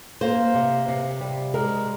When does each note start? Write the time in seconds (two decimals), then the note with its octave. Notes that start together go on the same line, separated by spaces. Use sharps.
0.21 A#3 C5
0.55 C3
0.88 C3
1.21 G3
1.54 G#3 A#4